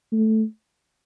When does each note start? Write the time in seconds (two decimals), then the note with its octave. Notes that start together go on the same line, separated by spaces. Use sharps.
0.12 A3